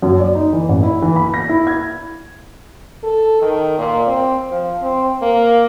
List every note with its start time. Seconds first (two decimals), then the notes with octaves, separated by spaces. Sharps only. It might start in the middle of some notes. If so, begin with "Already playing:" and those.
0.02 F#2
0.20 D5
0.35 D#4
0.53 E3
0.69 A1
0.83 E4
1.02 E3
1.16 B5
1.34 A#6
1.49 E4
1.67 G#6
3.03 A4
3.42 D#3
3.78 A#2
4.07 C4
4.51 F3
4.82 C4
5.22 A#3